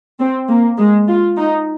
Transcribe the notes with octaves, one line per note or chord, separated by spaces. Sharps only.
C4
A#3
G#3
F4
D#4